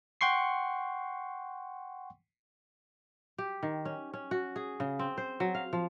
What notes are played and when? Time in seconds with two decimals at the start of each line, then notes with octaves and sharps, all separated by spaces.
0.21 F#5 G5 C6 C#6 C7
3.38 G4
3.63 D#3
3.85 C#4
4.14 C#4
4.31 F#4
4.56 G#4
4.80 C#3
4.99 C4
5.18 C5
5.40 F#3
5.55 F5
5.73 F3